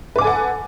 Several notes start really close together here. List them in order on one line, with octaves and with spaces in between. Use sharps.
B4 D6 G#5 A4 F#5